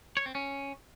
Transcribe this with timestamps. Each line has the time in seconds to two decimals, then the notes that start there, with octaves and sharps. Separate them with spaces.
0.17 C#5
0.26 C4
0.35 C#4